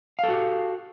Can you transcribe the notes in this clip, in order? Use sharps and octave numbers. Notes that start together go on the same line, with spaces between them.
F#4 G4 A4 F5